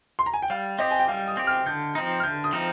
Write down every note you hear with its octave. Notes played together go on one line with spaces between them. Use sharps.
C6
A#5
G#5
G5
G3 F5
C4 G4 D#5
G#5
G5
G3 F5
D#6
C4 G4
F6
D3 G6
F3 C4 D#4
F6
D3 G6
D#6
F3 C4 D#4